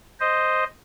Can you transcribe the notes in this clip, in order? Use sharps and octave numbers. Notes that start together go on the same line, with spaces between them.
C5 D#5